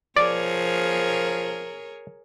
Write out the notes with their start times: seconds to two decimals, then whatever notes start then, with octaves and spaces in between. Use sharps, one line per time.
0.17 F3 G#4 A#4 C#5 D5